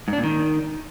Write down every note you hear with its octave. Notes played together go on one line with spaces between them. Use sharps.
G#2
D4
A#2
D#3